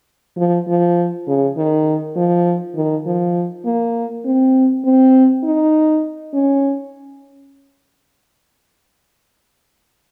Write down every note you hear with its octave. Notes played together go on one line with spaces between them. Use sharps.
F3
F3
C#3
D#3
F3
D#3
F3
A#3
C4
C4
D#4
C#4